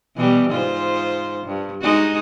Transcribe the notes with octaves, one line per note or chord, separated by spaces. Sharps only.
B2 E3 G3
G#2 F4 C5
G2
G#3 D#4 F#4